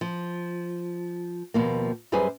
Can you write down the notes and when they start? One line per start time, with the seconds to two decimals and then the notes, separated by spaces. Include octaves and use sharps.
0.01 F3
1.54 D#2 B2 F3 A#3
2.12 F#2 G3 G#4 B4 C5 G#5